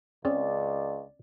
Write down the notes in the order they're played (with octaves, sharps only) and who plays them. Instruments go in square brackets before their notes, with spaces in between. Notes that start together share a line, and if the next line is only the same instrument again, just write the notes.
[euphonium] C#2 [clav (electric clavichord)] C4 C#4 G#4 [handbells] D5